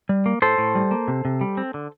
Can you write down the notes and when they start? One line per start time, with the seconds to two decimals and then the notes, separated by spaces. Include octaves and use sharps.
0.09 G3
0.26 A#3
0.42 A2 A4 C5
0.58 A2
0.75 G3
0.91 A#3
1.08 C3
1.25 C3
1.41 G3
1.57 C4
1.74 D3